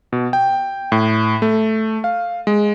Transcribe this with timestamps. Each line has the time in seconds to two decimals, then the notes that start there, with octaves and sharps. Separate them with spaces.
0.13 B2
0.33 G5
0.92 A2
1.42 A3
2.04 F5
2.47 G#3